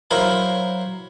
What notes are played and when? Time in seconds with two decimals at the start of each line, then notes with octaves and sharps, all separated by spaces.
0.11 F#3 E4 A#4 C5 F5 B5